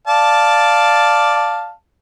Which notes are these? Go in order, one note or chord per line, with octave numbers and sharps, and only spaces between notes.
D5 F5 A5